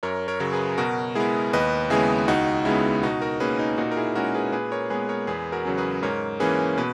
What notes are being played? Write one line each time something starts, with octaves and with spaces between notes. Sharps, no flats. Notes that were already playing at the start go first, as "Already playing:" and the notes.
F#2 A#4 C#5
A#4 C#5
C#3 F#3
G#4 B4
B2 F#4 A#4
G#3 B3 E4 G#4
D#2 B4 D#5
C#3 G#3 B3 E4 G#4
C#2 D#4 F#4
C#3 G#3 B3 E4
B2 D#4 F#4
F#4 A#4
A#3 C#4 G#4 B4
D#4
A#2 D#4 F#4
A#4
E4 G#4
G#3 C#4 F#4 A#4
G#4 B4
A#2 G#4 B4
A#4 C#5
G#3 B3 G#4 B4
A#4 C#5
E2 G#4 B4
F#4 A#4
C#3 F#3 C#4
G#4 B4
G#2 A#4 C#5
E3 A#3 C#4 G#4 B4
B2 B4